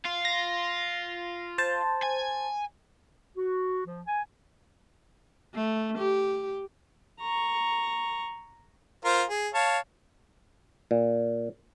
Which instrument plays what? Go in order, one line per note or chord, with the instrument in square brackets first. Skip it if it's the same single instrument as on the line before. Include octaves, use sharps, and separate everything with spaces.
[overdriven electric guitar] F4
[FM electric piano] A#6
C5 A5
[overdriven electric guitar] G#5
[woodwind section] F#4
F3
G#5
[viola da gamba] A3
G4
[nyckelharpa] A#5 C#6
[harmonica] F4 A#4 C5
G#4
C#5 F5 A5
[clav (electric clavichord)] A#2